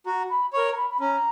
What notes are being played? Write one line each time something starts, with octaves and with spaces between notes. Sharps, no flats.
F#4 A#5
B5
A#4 C#5 C#6
A#5
B5
B5
C#4 A#5